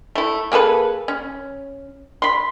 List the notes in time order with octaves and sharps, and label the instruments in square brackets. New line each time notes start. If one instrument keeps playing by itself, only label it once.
[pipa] A3 E4
A#3 G#4 A4 B4
C#4
B5 C6